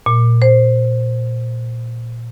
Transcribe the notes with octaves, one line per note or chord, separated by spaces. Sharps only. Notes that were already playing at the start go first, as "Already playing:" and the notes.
A#2
C5